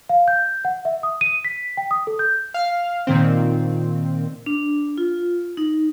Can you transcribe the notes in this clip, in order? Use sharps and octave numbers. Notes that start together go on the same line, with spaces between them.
F5
G6
F#5
E5
D#6
D#7
B6
G5
D#6
A4
G6
F5 F6
A#2 D#3 C4
D4
F4
D#4